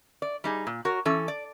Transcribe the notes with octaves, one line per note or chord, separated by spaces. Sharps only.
D5
G3 D#4 G#4
A#2
F#4 A#4 C#5
E3 C#4 A4
D5